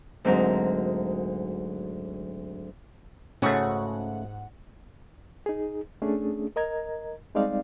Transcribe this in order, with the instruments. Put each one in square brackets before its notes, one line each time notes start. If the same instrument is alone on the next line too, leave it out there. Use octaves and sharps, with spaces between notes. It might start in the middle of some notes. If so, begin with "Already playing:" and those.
[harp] D2 G#2 F#3 C4 A#4
[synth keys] G#2 F#5 [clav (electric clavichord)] C#3 A3 [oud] C#4 F#4
[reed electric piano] D#4 G#4
A3 C#4 D4 G#4
A#4 D#5 A#5 G#6
G3 G#3 C4 D#4 D5 F5